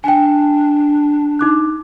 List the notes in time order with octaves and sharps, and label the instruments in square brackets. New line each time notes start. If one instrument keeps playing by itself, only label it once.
[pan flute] D4 [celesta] G5 G#5
[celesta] D#4 D6 F#6